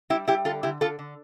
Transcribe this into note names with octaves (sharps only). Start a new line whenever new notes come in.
G3 E4 G4
G3 E4 G4
D3 F4 A4
D3 E4 G4
D3 F4 A4
D3